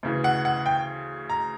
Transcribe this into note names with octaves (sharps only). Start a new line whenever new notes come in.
D2 C#3 E3
F#5
F#5
G5
A#5